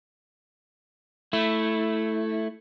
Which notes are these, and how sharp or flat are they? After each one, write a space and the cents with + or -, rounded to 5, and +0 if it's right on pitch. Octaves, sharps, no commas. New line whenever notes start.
A3 +0 E4 +0